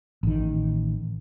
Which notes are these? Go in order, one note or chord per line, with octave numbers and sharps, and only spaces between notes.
A1 D#3